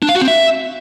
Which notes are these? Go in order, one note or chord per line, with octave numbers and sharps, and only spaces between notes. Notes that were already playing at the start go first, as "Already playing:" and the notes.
D4
F5
F#4
C4
E5